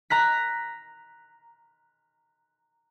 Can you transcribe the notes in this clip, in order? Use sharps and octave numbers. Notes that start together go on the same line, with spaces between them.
A#5 F#6 B6